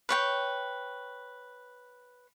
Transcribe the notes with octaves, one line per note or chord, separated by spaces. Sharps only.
B4 C#5 G5